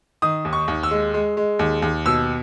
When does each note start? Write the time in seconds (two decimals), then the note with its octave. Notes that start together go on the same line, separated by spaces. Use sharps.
0.22 D#3 D#6
0.45 D#2
0.53 C#6
0.68 D#2
0.83 E6
0.91 G#3
1.14 G#3
1.37 G#3
1.59 D#2
1.82 D#2
2.06 B2 E6